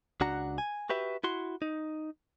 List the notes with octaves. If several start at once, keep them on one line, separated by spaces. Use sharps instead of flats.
C#2 D4 F#4 F#5 A#5
G#5
F#4 G4 B4 E5
E4 F#4 C6
D#4